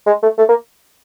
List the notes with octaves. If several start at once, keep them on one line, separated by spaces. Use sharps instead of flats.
G#3
A3
A3
A#3